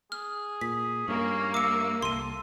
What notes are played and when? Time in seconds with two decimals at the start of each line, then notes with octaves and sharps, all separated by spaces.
0.12 G#4 F6
0.61 A#2 B6
1.08 G2 A#3 C#4
1.54 E5 D6 C#7
2.02 C2 A4 C6 D#7